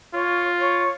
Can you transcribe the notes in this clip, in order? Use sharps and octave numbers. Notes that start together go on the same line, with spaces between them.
F4 C#5
C#5